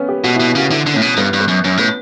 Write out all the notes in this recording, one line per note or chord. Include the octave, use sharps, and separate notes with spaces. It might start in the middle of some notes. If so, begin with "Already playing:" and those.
Already playing: B3 C#4
G4
B2 F#4
E4
B2
E4
C#3 F#4
D3 E4
D3
A2 C#4
B2
G2 B3
G2
B3
F#2
F#2 C#4
A2 B3